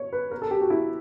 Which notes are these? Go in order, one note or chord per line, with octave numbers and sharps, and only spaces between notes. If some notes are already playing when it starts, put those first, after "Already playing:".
Already playing: C#5
B4
A#4
A4
G4
F#4
E4